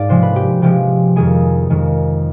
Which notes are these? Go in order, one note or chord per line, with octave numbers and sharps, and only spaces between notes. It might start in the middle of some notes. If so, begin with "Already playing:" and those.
Already playing: G#2 D5 F5
C3 F3 G#3 C5
B4
G4
C3 F3 G#3 G4
F2 D#3 G#3 G#4
F2 D#3 G#3